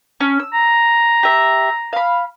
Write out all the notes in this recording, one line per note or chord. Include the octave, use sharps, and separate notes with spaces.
C#4
E6
A#5
G4 E5
F5 B5